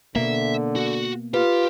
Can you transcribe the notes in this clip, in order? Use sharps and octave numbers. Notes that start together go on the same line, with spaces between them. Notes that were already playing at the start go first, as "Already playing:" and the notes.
B2 D3 A#3 E5
F#4
F4 G4 B4